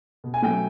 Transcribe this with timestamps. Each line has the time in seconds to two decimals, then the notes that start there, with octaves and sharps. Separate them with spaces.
0.24 B2
0.34 G#5
0.42 F#3 A3 G5